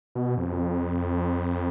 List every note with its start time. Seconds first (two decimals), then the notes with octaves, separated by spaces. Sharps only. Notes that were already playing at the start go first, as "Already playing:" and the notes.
0.15 B2
0.37 F2